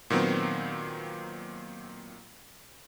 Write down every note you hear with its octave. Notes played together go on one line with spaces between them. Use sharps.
A#2 D#3 F#3 B3 C4